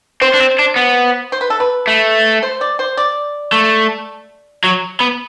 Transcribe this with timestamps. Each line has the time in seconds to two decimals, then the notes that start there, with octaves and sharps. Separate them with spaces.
0.21 C4 C5
0.34 D4
0.40 C4
0.59 D4
0.76 B3
1.32 C5
1.41 B4
1.50 A4
1.60 B4
1.88 A3
2.43 C5
2.61 D5
2.79 C5
2.97 D5
3.53 A3
4.64 F#3
5.00 B3